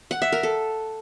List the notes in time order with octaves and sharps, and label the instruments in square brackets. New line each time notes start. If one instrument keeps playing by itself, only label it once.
[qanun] F#5
E5
A#4
A4